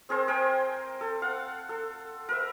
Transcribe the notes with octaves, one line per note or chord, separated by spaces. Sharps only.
C4 G#4 A#4 C5
A#4 C5 G5 G#5
A4
F5 F#5
A4
A#4 B4 E5